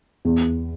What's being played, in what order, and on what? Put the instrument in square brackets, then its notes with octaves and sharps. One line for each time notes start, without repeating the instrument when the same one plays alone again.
[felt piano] E2